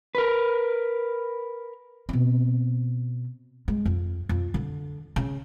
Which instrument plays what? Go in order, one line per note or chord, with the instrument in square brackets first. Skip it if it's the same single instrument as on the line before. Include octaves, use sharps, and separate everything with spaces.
[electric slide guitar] A#4 B4
[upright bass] B2 C4
G#3
F2
F2
D3
C#3